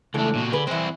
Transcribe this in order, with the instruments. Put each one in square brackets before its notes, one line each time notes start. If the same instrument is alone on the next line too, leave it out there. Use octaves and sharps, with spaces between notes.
[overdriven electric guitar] C#2 A3 [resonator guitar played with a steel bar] E3 D4 A4
[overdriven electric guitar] A#2 F#4
[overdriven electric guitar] D3 [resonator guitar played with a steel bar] G#4 B4
[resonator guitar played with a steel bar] E3 G#3 [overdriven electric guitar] C4 E4